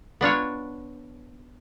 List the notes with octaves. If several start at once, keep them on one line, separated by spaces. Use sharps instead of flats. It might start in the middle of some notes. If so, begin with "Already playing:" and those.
B3 D4 F4 C#5